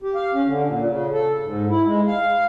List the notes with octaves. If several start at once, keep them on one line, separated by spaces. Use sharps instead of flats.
G4
F5
C#4
D3
A#2
C#3
A4
G#2
E4
G#3
F5